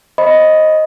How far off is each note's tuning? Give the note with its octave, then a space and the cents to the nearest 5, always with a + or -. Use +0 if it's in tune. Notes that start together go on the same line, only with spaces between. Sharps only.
C5 +25 D#5 +5 B5 +0